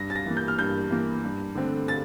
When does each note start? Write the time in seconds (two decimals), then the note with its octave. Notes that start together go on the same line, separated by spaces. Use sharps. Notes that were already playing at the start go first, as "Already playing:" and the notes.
Already playing: G2 A#6
0.10 A6
0.15 A#6
0.26 E3 A#3
0.37 G6
0.48 F6
0.59 G2 G6
0.91 E3 A#3
1.24 G2
1.55 D3 A3 C4
1.88 A6